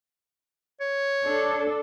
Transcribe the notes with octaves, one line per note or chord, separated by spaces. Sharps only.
C#5
D4 A4